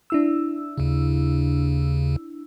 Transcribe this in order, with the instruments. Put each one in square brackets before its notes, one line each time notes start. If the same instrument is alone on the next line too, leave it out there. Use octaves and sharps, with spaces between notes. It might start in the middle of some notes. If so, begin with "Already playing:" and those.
[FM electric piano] D4 E4 E6
[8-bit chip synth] D#2 C#3